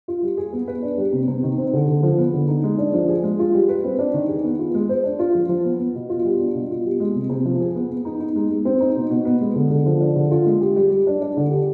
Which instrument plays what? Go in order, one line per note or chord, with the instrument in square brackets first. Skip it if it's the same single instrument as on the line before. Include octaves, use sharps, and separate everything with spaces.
[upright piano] F4
G3
G#4
B3
B4
D4
G3
C3
C3
D#3
C4
D3
D3
F3
B3
D3
D#4
G#3
D4
F3
G#4
G#3
F4
G3
B4
C4
D4
D#3
G#4
B3
F4
G#3
C5
D4
F4
F3
F3
B3
B3
B2
F4
G3
D4
B2
F4
G3
G#3
C3
C3
F3
G#4
B3
B3
D#4
D#4
G#3
G#3
C4
D#4
B2
B2
B3
G#3
D3
D3
F3
D4
D3
F4
G#3
G4
G3
G3
D4
D4
D3
G4